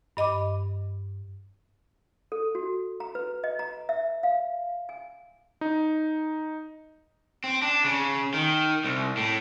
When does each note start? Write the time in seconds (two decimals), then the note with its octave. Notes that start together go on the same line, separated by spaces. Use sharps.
0.17 G2 D#5 B5 D6
2.32 A4
2.55 F#4
3.00 A#5
3.15 B4
3.44 D#5
3.59 A#5
3.89 E5
4.23 F5
4.89 G#5
5.61 D#4
7.44 C4
7.62 D4
7.84 C#3
8.34 D#3
8.84 C2
9.17 A2